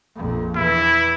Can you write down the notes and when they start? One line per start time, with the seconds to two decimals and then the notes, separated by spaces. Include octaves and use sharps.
0.16 A#1 F2
0.56 E2 E3 E4